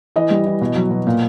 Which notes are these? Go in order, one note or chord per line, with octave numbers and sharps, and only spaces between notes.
E3 D#5
G3
E3
B2
F#3
B2
A#2